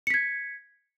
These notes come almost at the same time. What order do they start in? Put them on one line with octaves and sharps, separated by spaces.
C#7 B6 G#6